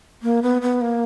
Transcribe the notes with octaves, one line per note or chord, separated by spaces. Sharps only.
A#3
B3
B3
A#3